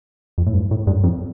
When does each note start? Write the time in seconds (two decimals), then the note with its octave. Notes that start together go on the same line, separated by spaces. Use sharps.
0.38 F2
0.47 A2
0.54 G2
0.71 A2
0.87 G2
1.04 F2